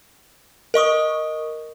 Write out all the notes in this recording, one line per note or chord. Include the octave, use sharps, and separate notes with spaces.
A#4 D#5 C#6 D#6